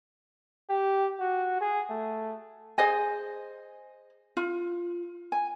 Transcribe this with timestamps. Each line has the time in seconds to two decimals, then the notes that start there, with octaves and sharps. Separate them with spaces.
0.70 G4
1.20 F#4
1.61 G#4
1.90 A3
2.78 G#4 C5 D#5 G#5
4.37 F4
5.32 G#5